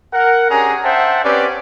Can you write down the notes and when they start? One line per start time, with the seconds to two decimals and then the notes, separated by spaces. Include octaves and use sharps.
0.12 A#4 F#5
0.49 C#4 D4 G4 G#4 A#5
0.83 C5 E5 F#5 G5 A5
1.24 C4 C#4 G4 B4 D5